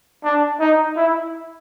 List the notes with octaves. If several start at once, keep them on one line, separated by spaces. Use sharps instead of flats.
D4
D#4
E4